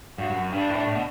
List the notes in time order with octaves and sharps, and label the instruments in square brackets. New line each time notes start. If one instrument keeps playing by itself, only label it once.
[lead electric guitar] G2 [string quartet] F#4
[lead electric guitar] G2
F#2
[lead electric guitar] G2 [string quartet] D4
[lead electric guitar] A2
A2
B2